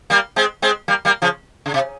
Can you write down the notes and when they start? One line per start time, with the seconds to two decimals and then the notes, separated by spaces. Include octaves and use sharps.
0.10 G3 A#3
0.36 G#3 C4
0.62 G#3 C4
0.88 G3 A#3
1.05 G3 A#3
1.22 C#3 F3
1.66 C#3
1.74 C3